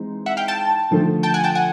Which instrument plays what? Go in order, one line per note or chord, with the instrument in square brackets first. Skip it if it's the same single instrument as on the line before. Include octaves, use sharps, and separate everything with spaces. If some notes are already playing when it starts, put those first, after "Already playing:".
Already playing: [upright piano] E3 G#3 C4 D#4
[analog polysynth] E5 F#5
F5 G5
G5 A5
[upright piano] D3 F3 A3
[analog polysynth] G5 A5
F#5 G#5
G5 A5
F#5 G#5